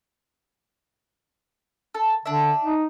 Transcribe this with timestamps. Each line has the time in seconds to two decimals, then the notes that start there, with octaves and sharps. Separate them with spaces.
1.95 A4
2.26 D3 D4 E5
2.64 D#4